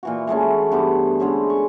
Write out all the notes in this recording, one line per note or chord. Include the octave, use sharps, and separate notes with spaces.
A#2 E3 F#4
E3 G#3 A3 C#4
G2 B3 C5 D6
D3 G#3 C#4 C5
C#6